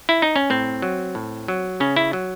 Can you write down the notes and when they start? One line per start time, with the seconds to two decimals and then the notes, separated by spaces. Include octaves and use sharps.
0.09 E4
0.22 D#4
0.36 C#4
0.50 A2 C4
0.82 F#3
1.15 A2
1.48 F#3
1.80 C#3 C#4
1.96 E4
2.13 F#3